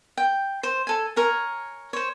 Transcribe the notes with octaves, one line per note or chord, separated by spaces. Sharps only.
G5
C5
A4 G#5
A#4 C#5 G#5
C5 C#5